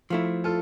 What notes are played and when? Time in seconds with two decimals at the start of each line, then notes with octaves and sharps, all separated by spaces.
0.10 F3 A3 E4
0.44 F4 A4